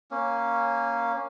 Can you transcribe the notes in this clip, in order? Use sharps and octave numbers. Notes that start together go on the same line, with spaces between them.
A#3 C#4